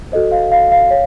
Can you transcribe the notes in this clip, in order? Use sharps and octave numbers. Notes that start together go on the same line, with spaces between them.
F#4 A4 C5 D#5
F5
F5
F5
C#5